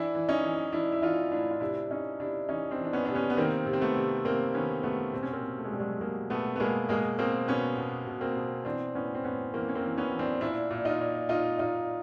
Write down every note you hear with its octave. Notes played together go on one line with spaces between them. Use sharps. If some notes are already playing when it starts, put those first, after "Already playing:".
Already playing: E3 D4 E4
E3
C#4 D#4
E3
E3 D4 E4
E4
E3 D#4 F4
A2 D4 E4
F4
C3 D4 E4
C3 C#4 D#4
C3 D4 E4
E3 C#4 D#4
C4 D4
E3
D4
B3 C#4
C3 D4
B3 C#4
B3
D#3 A#3 C4
C3
C4
A3 B3
C3
C3 A#3 C4
D#3 B3 C#4
C3 A3 B3
B2 C4
C#4
A#3 C4
B2
A3
G#3
B2 G3
F#3 G#3
B2 G#3 A#3
B2 A3 B3
B3
B2 G#3 A#3
B2 G#3 A#3
B2 A#3 C4
B2 B3 C#4
B2
B2
A#3 C4
B2
E3 C4 D4
A2 B3 C#4
C4
A2 B3 C#4
E3 A#3 C4
C#4
A#3 C4
E3
B3 C#4
E3
C4 D4
A#2 D4 E4
A#2
D#4 F4
A#2
A#2 D#4 F4
A#2 D#4 F4